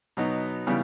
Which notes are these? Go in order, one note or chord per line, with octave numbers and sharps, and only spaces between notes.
B2 F#3 B3 D#4
C#3 E3 G3 B3